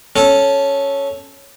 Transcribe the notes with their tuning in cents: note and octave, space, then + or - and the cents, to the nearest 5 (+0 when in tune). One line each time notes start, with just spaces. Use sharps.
C#4 +0 A4 -10